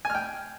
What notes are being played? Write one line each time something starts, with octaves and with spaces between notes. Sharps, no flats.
G5 G#5 F6